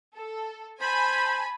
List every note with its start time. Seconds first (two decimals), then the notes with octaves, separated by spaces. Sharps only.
0.17 A4
0.81 C5 G#5 A5 B5